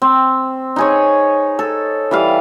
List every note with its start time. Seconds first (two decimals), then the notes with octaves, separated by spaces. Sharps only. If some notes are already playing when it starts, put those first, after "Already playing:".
0.02 C4
0.76 D#4 G#4 C#5
1.59 A4
2.11 E3 G3 F5